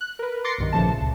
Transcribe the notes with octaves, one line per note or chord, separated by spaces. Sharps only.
F#6
A#4 B4
C6 D6 A6 A#6 C7 C#7
B1 G2 D#3
A1 A#2 C#3 F3 A3 A5
C#2